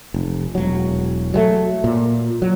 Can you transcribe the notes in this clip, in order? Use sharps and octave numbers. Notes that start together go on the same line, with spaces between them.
F1
E1 F#3
F#3 G3 A3
A#2
F#3